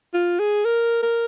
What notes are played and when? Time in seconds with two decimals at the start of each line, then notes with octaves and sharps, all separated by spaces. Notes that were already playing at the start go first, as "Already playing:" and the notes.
0.14 F4
0.39 G#4
0.65 A#4
1.03 A#4